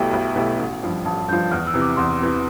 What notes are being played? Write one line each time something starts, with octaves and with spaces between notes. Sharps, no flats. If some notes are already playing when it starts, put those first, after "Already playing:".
Already playing: B1 B2 A3 E4 G4 E5 G5
B1
B2 A3 E4 G4
A1
G2 F3
A1 A5
G2 F3 G6
E2 F6
E6
C3 E3
D6
E2 C6
C3 E3